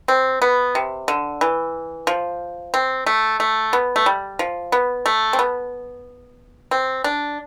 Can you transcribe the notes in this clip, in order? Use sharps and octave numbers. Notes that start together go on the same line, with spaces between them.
C4
B3
C3
D3
E3
F3
C4
A3
A3
B3
A3
G3
F3
B3
A3
C4
B3
C4
D4